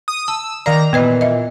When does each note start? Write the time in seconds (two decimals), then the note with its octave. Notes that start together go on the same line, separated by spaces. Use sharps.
0.08 D#6
0.28 A5 E6
0.66 D#3 A#3 D5 A#5
0.93 A#2 E3 B3 B4 D#5
1.21 D#5 E5